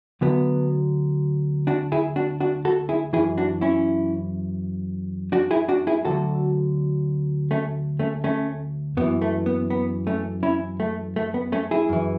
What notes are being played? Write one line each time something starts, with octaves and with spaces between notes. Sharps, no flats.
D2 D3 F#3 B3
D4 F#4
E4 G#4
D4 F#4
D4 F#4
F#4 A4
E4 G#4
F#2 E3 E4 G#4
D4 F#4
C#4 E4
D4 F#4
E4 G#4
D4 F#4
E4 G#4
D2 D3 F#3 F#4 A4
A3 C#4
A3 C#4
A3 C#4
F#2 E3 B3
A3
B3
B3
A3 C#4
C#4 E4
A3
A3
B3
A3 C#4
E4 G#4
F#2 E3